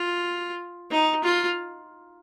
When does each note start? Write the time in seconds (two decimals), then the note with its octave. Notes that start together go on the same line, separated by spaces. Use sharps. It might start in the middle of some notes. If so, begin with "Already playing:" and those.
Already playing: F4
0.91 D#4
1.23 F4